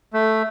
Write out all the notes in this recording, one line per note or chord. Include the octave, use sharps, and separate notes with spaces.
A3